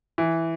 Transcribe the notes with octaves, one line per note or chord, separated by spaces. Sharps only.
E3